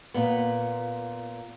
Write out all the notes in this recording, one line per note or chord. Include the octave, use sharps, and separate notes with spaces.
A#2 B3